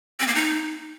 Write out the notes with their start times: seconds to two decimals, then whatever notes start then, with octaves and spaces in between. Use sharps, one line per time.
0.20 C4
0.27 A#3
0.35 D#4